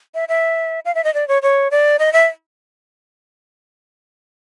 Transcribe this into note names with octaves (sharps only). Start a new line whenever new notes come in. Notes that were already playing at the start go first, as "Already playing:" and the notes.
E5
E5
F5
E5
D#5
D5
C#5
C#5
D5
D#5
E5